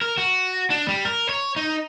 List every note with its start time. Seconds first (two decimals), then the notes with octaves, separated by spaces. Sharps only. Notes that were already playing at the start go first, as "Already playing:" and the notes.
0.02 A#4
0.18 F#4
0.70 D4
0.88 G3
1.05 A#4
1.29 C#5
1.56 D#4